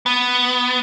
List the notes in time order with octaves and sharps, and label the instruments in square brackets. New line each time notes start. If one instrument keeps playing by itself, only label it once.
[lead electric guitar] B3